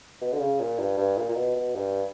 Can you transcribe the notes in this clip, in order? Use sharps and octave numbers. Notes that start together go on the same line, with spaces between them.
B2
D3
C#3
A#2
G2
G2
A#2
A#2
B2
B2
G2